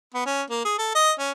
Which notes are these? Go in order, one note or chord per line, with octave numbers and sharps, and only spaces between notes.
B3
C#4
A#3
G#4
A4
D#5
C#4